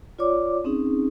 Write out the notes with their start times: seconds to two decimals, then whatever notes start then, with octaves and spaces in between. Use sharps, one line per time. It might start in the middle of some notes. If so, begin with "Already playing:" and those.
0.19 F4 C#5 D5 D6
0.64 C4 C#4 D#4 G#4